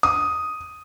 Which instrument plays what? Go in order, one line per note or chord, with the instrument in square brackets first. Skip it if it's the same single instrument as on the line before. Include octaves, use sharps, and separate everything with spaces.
[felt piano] D#6